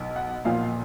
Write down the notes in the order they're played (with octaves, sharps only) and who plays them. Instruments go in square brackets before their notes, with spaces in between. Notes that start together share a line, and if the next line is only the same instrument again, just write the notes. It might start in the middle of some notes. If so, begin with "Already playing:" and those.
Already playing: [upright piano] B1 B2
F#5
B1 A#2 F3 F5